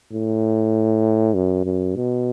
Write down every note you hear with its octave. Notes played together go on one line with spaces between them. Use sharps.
A2
F#2
F#2
B2